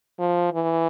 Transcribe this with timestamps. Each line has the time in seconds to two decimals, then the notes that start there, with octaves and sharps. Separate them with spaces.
0.19 F3
0.53 E3